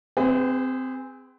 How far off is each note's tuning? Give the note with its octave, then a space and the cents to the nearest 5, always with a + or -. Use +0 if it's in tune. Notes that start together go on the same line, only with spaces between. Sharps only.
C4 -15 G#4 -25 B4 +35